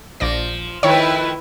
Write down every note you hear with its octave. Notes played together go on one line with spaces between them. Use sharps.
A#1 F3 D5 A#6
D#3 F3 A3 E4 B4 C#5